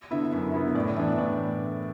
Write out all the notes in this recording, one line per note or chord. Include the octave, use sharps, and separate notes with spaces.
D3 B3 E4 E5
F#2 E5
D3 B3 E4
A2 D5
D5
E3 B3 D4 E5
D5
A2 D5